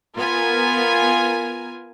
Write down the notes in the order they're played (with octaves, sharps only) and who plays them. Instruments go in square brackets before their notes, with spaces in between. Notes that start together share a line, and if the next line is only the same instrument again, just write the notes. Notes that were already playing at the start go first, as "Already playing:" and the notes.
[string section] B3 F4 A#4 G#5